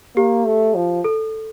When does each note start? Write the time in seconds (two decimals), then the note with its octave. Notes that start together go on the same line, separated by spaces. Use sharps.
0.16 A#3 G4
0.45 A3
0.75 F3
1.04 A4